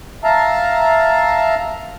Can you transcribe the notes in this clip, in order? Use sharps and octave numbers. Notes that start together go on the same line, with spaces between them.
E5 F5 A5 A#5